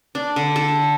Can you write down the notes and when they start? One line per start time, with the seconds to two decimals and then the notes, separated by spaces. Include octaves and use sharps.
0.15 D4
0.36 D3
0.56 A4